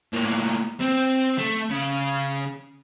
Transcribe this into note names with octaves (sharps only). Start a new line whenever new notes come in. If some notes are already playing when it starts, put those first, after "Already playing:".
A2 A#3
C4
A3
C#3